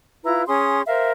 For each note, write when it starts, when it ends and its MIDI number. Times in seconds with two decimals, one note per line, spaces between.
0.24 0.43 64
0.24 0.43 65
0.24 0.43 71
0.24 0.43 82
0.48 0.82 61
0.48 0.82 68
0.48 0.82 84
0.48 0.82 87
0.87 1.12 70
0.87 1.12 72
0.87 1.12 76
0.87 1.12 77